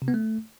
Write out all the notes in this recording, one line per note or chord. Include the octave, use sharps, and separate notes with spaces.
C3
B3
A3